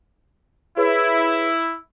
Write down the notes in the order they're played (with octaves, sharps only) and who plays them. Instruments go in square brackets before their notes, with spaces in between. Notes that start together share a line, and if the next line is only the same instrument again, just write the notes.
[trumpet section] E4 [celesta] G#4 B4 C#5